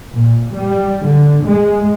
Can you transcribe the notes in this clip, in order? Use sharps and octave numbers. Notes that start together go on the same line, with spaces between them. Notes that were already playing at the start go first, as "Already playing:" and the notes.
A#2
G3
D3
G#3